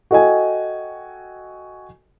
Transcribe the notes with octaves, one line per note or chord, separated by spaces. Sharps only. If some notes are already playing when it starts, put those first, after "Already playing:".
F#4 A4 D#5 G5 G#5